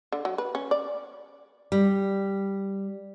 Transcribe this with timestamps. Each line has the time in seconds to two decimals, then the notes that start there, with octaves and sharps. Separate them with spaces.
0.12 D3
0.25 F#3
0.38 B4
0.55 C#4
0.71 D5
1.72 G3